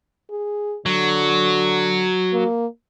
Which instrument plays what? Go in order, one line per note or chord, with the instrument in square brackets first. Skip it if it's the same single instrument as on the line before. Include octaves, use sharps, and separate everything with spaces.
[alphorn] G#4
[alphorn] D3 [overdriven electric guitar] F#3
[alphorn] A#3